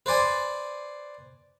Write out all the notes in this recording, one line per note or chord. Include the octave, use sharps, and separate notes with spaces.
B4 C5 D5 G#5